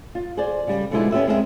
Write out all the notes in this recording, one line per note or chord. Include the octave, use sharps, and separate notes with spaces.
F4
G#4 C5 D5
C#3 G3
B2 D3 F3 G#3 D#4 E4
B3 C#4 G4 B4 E5
G#3 C4 G#4 A#4 D5 E5